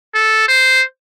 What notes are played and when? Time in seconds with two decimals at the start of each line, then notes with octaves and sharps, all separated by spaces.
0.15 A4
0.48 C5